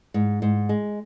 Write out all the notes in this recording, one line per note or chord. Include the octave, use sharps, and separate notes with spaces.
G#2
G#2
G#3